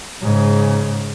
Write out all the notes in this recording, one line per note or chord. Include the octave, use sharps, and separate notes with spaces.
G#2 C#3